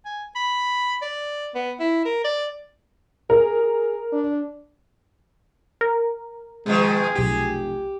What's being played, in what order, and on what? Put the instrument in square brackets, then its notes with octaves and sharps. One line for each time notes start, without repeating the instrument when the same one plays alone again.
[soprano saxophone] G#5
B5
D5
B3
E4
A#4
D5
[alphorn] G#4 [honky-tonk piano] A#4
[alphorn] G#4
D4
[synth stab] A#4
[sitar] B2 D#3 F3 [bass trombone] G#3 [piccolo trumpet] G#4
[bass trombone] F1 [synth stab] B1 G#5 [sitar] G4